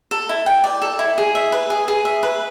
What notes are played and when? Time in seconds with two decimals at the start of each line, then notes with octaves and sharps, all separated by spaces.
0.11 A4
0.29 E4
0.46 G5
0.64 D5
0.82 A4
0.99 E4
1.18 G#4
1.35 E5
1.52 B4
1.70 G#4
1.88 G#4
2.05 E5
2.23 B4